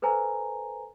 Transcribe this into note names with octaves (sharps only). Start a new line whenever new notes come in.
A4 B4 C5 G#5 A#5